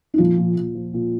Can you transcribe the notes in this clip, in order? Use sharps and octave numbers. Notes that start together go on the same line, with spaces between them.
D#4
A#2 F3 F4
A#2
A#2
F3
A#2